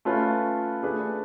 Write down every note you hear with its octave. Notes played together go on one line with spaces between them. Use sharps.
A3 C#4 F4 B4
A3 D4 G#4 B4